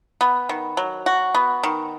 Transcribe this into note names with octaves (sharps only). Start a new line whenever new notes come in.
B3
D#3
F#3
F#4
B3
D#3